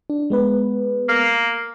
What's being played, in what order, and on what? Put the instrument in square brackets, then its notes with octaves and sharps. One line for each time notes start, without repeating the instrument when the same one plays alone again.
[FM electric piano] D4
G#3 B3 B4
[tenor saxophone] A#3